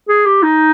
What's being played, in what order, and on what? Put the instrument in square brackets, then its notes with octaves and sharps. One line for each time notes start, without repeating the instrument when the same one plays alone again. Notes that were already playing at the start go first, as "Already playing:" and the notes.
[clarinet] G#4
G4
D#4